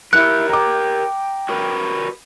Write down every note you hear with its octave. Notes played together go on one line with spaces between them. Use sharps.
E4 G4 A#4 F#6 C#7
G5 A#5 D6
F#4 A#4 B4